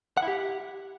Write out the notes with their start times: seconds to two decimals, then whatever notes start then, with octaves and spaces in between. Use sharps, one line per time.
0.17 F#5
0.23 E4
0.28 G4